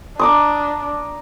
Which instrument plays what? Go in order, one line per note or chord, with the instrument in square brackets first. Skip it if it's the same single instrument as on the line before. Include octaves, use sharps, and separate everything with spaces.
[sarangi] D4 [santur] A#5 D6 D#6